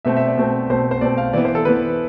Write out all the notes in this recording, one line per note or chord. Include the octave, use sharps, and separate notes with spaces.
B2 A3 C4 E5
E5
D5
B2 A3 C4
B2 A3 C4 C5
C5
B2 A3 C4 D5
F5
E3 B3 D5
C5
A4
E3 B3 B4